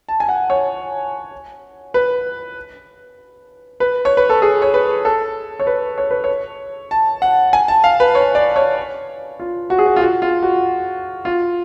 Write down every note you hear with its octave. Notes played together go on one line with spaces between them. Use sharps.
A5
G#5
F#5
C#5
B4
B4
C#5
B4
A4
G#4
C#5
B4
A4
C#5
B4
C#5
B4
C#5
A5
F#5
G#5
A5
F5
B4
C#5
D5
C#5
F4
F#4
G#4
F#4
F4
F#4
F4
F#4
F4